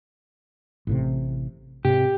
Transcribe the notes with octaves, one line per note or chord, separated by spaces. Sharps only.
A1 A2 C3
G#2 C3 G4